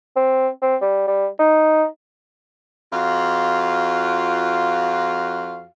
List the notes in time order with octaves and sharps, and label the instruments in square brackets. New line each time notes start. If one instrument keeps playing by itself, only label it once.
[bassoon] C4
C4
G3
G3
D#4
[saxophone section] F2 F4 F#4 F5